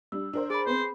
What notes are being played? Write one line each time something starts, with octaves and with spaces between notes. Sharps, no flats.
G3 D4 E6
D4 A#4 C5
G#4 D5 B5
B3 C4 C5